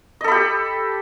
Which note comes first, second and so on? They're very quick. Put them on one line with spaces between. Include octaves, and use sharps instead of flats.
D#5 A4 B5 G4